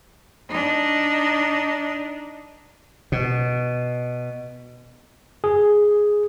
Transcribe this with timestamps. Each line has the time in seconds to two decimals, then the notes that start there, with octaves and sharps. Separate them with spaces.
0.49 D4 D#4
3.12 B2
5.44 G#4